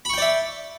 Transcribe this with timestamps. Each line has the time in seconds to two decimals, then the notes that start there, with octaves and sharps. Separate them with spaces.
0.05 B5
0.09 C#6
0.13 G5
0.18 D5
0.22 E5